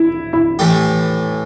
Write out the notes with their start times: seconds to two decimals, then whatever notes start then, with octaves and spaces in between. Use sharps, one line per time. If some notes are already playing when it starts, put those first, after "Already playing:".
Already playing: E4
0.33 E4
0.59 A2 E3 A3 G4